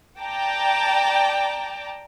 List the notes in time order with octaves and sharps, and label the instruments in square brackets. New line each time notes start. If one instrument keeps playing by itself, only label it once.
[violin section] D5 G5 A5 A#5 D6